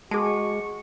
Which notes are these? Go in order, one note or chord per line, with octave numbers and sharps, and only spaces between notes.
G#3 F#4 G#4 A5 C#6